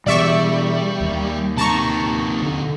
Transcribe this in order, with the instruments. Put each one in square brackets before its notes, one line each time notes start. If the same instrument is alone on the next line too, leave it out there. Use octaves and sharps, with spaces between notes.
[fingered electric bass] B2 E3 [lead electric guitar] G3 [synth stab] D5 E5 C#6
[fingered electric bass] D#2
[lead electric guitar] C3 D#4 [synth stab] A5 A#5 C#6
[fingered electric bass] D3